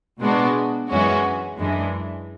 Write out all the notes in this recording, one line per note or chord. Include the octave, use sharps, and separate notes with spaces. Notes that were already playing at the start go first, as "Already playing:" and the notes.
B2 G#3 B3 D4 F#4
F#2 E3 G#3 C#4 F#4
F#2 E3 G#3 D4